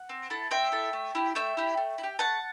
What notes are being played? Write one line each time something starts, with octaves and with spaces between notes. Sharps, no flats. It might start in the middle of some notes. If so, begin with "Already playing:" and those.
Already playing: F#5
C4
E4 A4
C4 E5 G5
E4 A4
A3
E4 G4
A3 E5 G5
E4 G4
A3
E4
G4
A3 F#5 A5